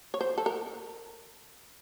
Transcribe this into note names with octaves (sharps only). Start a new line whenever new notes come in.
C#5
C5
A4
A#4